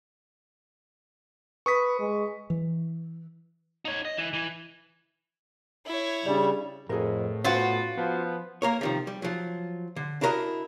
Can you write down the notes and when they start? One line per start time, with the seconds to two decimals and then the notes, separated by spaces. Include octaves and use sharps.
1.66 B4 C#6 D#6 B6
2.00 G#3
2.50 E3
3.85 D#4 C#5
4.05 D#5
4.17 E3
4.33 E3
5.86 E4 C#5
6.24 C#3 G3 D4 D5 F7
6.89 F2 A2 G#4 A#4
7.44 B3 C#4 F4 F#4 C5 F#5
7.97 F3 B3
8.62 A#3 A#4 C#5
8.81 C3 D#3 F3
9.07 G3
9.22 F3 F#3
9.96 D3
10.21 D4 E4 F#4 A#4 B4 D#5